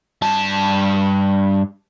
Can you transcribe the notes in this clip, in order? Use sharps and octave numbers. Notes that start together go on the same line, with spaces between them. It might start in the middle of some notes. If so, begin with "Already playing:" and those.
G2 A5